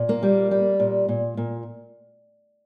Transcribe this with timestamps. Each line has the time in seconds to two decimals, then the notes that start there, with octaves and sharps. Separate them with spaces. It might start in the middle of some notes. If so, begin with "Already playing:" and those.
Already playing: A#2
0.09 A#3
0.23 G3
0.51 G3
0.80 A#2
1.09 A#2
1.37 A#2